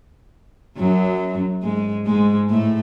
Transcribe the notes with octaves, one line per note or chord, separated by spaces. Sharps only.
F#2 F#3
G#2 G#3
G#2 G#3
A2 A3